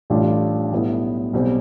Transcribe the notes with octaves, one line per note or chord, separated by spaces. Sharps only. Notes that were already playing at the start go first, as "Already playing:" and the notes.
A1 A2 G3 D4 F4
B1 A2 G3 B3 E4
B1 B2 G3 C4 G4